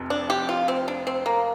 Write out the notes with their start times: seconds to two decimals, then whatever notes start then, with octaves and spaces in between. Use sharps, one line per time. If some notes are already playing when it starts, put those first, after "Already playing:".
Already playing: F1 F2 C3
0.10 D4
0.30 G4
0.49 F4
0.68 C4
0.88 D4
1.07 C4
1.26 A#3